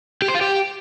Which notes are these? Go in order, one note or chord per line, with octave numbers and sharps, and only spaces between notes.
G4
C5
F4
G4